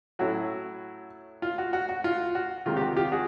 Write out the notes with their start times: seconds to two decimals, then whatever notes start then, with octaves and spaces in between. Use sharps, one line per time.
0.19 A2 F#3 A3 C#4 E4 F#4
1.42 F4
1.58 F#4
1.73 F#4
1.89 F#4
2.04 F4
2.35 F#4
2.65 C#2 C3 D#3 G#3 F4
2.77 G4
2.81 F#4
2.96 F4 G4
3.12 F#4 G#4